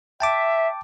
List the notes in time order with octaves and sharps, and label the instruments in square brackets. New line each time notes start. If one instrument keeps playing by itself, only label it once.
[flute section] E5 [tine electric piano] G5 A5 D6